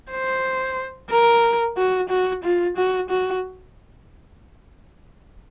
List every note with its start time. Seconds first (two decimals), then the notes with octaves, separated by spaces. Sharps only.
0.11 C5
1.10 A#4
1.77 F#4
2.09 F#4
2.44 F4
2.77 F#4
3.10 F#4